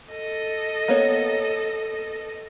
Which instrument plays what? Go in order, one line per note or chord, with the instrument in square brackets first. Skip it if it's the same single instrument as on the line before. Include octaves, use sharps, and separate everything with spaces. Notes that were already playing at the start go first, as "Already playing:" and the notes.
[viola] A4 D#5
[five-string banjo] A#3 B3 C#5